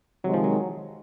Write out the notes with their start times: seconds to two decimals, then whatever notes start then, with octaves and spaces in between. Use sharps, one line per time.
0.24 C3 D#3 F#3 G#3
0.34 F3
0.44 F#3